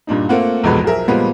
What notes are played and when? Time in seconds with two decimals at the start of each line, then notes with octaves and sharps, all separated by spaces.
0.07 G2 A#2 D4 D#4
0.29 A3 A#3 C4 F4 F#5
0.63 A#1 E2 B2 G#3 A4 B4
0.84 B1 F3 G#4 A#4 E5
1.08 A#2 F3 G3 G#3 A#3 B3